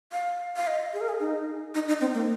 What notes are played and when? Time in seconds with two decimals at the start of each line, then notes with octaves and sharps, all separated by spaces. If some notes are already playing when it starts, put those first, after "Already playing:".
0.12 F5
0.56 F5
0.67 D#5
0.93 G#4
1.01 A#4
1.08 G#4
1.20 D#4
1.75 D#4
1.88 D#4
2.01 C4
2.14 A#3